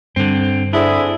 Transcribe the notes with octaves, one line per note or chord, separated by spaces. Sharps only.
G2 D3 C4
D3 C4 D4 E4 G#4